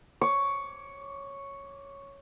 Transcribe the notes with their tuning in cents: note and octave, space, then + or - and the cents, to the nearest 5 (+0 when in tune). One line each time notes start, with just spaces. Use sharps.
C#5 +0 D6 -25